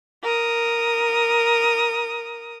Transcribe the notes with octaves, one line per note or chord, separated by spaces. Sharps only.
A#4 D#6